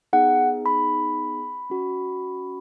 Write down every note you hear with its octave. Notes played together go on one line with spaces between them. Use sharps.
B3 D#4 G#4 F#5
B5
C#4 F#4